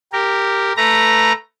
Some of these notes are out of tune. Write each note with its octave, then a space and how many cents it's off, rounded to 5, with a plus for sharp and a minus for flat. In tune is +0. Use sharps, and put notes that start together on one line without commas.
G4 +0 A#4 -10
A3 +5 B4 +0 A#5 +0